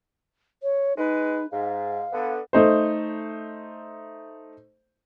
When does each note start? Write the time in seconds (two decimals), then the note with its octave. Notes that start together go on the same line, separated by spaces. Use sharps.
0.63 C#5
0.97 G#3 D#4 B4
1.51 G#2 F5
2.12 D3 B3
2.53 A3 D#4 C5